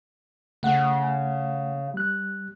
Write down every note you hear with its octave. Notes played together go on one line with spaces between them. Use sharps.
C#3 A3 F#5
G3 F#6